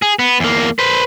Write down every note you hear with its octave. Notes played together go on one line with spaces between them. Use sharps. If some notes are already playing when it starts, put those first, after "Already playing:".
G#4
B3
E2 A#3
B4 C5